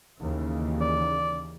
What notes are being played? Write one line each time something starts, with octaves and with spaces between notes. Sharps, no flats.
D#2 C#3 E3
D5